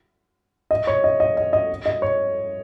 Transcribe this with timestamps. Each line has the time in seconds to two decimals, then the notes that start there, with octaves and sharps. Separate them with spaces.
0.71 D#5
0.87 C#5
1.04 D#5
1.20 D#5
1.37 D#5
1.53 D#5
1.86 D#5
2.02 C#5